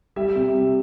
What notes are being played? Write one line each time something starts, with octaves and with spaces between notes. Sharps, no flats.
G3 E5
C3
G3